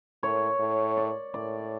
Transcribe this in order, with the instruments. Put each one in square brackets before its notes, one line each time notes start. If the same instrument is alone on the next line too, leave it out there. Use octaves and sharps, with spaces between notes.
[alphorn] A2 [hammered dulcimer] C#5
[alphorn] A2
[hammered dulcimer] D5
[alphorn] A2 [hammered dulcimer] D5